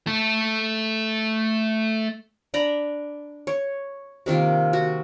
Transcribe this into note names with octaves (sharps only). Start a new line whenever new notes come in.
A3 A4
D4 D5 A#5 B5
C#5
C3 D#3 A#3 F4
F#4